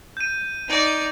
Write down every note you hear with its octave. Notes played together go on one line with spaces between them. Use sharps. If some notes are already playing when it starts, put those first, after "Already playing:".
G6 D#7
D#4 D5